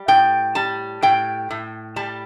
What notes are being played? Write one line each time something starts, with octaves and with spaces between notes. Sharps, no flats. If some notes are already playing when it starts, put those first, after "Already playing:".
Already playing: G3
A2 G5
G3 A5
A2 G5
A2
G3 A5